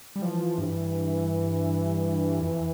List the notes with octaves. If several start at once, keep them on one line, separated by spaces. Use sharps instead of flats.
G3
E3 F3
G2
F2